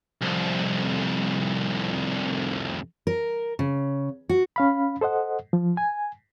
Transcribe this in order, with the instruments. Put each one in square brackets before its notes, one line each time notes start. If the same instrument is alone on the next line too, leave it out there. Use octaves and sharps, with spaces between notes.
[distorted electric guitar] C2 F2
[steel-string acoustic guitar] A#4
C#3
F#4
[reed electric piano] C#4 F5 B5
A4 C5 D#5 F#5
F3
G#5